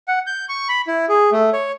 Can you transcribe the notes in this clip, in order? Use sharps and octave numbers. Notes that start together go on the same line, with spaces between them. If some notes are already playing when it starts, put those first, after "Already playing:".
F#5
G6
C#6
B5
E4
G#4
A3
C#5